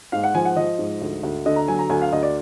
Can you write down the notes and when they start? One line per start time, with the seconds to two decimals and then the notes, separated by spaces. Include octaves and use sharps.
0.12 G#2 F5
0.23 F#5
0.34 F3 G#5
0.45 F#5
0.56 F3 D#5
0.79 G#2
1.01 D2
1.23 D2
1.46 D3 D#5
1.56 A#5
1.68 F#3 G#5
1.79 A#5
1.89 D2 G#5
2.02 F5
2.12 D2 D#5
2.23 D5